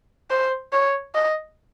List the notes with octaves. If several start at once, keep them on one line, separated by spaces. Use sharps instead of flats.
C5
C#5
D#5